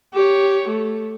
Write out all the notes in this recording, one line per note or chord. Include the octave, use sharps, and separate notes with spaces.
G4 C#5
A3